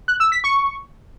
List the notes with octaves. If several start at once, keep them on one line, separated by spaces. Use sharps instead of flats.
F#6
E6
B6
C#6